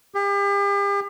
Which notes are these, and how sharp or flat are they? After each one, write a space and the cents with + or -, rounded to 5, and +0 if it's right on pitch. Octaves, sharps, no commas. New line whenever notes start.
G4 +40